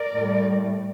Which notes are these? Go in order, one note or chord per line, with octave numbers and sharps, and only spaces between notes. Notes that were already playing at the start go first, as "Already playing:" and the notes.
Already playing: A#4 D5
A2 G3